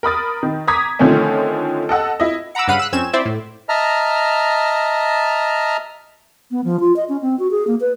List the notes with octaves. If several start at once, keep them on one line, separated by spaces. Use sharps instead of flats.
A#4 B5 D#6 A6
D#3
A#5 D6 D#6 G#6 B6
D3 D#3 F3 A3 C4 C#4
A4 D#5 F#5 E6
E4 D#5
F#5 A#5 B5 D6 E6
G2 C#3 F5 F#5 B5 D#7
E6 F#6
F2 C4 C#4 G#6 E7
C4 E4 C5 D5 E5
A2
D#5 E5 A5 A#5 F6
B3
F3
F4
D#5
C#4
C4
F#4
G#4
A#3
B4